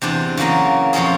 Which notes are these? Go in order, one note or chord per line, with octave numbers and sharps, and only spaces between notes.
E2 C3 D4 C5
C#3 E3 F#3 A#3 A#4
F2 A#2 F3 C#4 G#4